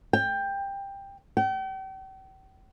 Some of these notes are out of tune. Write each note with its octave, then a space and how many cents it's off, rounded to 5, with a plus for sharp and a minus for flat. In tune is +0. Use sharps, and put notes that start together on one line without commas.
G5 +15
G5 -40